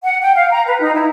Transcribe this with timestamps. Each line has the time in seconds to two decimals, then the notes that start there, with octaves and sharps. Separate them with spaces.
0.04 F#5
0.22 G5
0.36 F5
0.51 A#5
0.66 B4
0.81 D#4
0.94 E4